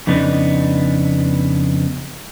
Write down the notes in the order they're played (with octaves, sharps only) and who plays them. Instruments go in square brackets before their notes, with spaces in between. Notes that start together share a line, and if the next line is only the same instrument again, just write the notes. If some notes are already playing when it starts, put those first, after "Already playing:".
[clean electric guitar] F2 C#3 B3 D4 D#4